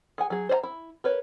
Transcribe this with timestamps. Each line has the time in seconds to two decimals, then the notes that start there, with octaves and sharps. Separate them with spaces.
0.18 G#4 F#5 G#5
0.30 F#3 G#4
0.49 C5 D5 A#5
0.63 E4
1.04 A#4 B4 C#5